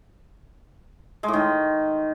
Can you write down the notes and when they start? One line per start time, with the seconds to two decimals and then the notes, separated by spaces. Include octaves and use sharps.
1.23 G#3
1.28 A2
1.33 D#3